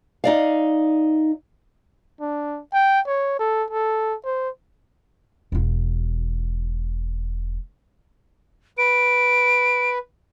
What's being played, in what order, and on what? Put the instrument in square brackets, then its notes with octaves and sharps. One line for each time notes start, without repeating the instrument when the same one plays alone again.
[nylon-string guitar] D#4 D5 F5
[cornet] D4
G5
C#5
A4
A4
C5
[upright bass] E1 F4
[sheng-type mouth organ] B4 [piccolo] D7